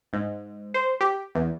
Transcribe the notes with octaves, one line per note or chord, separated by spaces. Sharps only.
G#2
C5
G4
E2